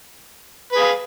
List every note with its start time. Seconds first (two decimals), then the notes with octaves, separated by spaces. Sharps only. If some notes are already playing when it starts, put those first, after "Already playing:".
0.72 B4
0.76 G#4
0.79 F5